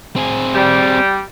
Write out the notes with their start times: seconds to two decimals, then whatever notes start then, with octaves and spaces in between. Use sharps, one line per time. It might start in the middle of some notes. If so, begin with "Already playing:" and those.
0.16 C4 G#4
0.53 G3